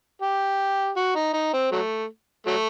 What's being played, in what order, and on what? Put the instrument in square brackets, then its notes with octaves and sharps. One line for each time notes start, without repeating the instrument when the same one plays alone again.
[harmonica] G4
F#4
D#4
D#4
C4
F#3 A3
F#3 A3